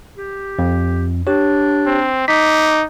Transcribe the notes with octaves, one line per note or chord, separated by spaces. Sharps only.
G4
F2
D4 G4 C#5
C4
D#4 D6 B6